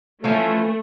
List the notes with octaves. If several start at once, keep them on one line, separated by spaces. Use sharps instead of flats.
E3 F3 A3 C#4